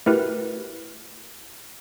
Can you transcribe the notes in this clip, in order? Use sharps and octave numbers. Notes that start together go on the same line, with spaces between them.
A3 E4 F#4 G4 A#4 B4